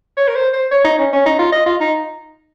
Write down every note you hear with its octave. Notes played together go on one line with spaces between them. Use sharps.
C#5
A#4
C5
C5
C#5
D#4
C#4
C#4
D#4
F4
D#5
F4
D#4